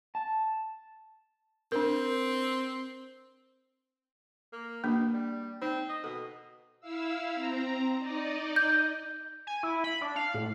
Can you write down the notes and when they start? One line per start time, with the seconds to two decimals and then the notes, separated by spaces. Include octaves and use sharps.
0.15 A5
1.72 C4 D4 A#4
4.53 A#3
4.84 B2 A#3 D4
5.13 G3
5.62 C4 D#4
5.89 D#5
6.04 B2 A4
6.81 E4 F5 E6
7.34 C4 A#5
7.99 D#4 D5 D#5
8.56 G6
9.47 G#5
9.63 E4
9.84 B5
10.01 D4
10.16 F5
10.34 A2